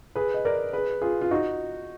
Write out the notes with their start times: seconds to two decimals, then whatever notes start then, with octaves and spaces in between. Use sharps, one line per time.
0.15 G#4 B4
0.34 D#5
0.45 A#4 D5
0.73 G#4 B4
1.02 F4 G#4
1.21 F4
1.31 D#4 F#4